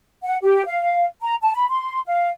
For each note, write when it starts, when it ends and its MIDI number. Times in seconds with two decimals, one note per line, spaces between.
0.23 0.36 78
0.43 0.65 67
0.66 1.06 77
1.21 1.34 82
1.42 1.53 81
1.54 1.66 83
1.69 1.99 84
2.06 2.28 77